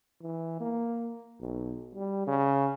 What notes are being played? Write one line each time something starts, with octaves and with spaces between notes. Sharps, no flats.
E3
A#3
B1
G3
C#3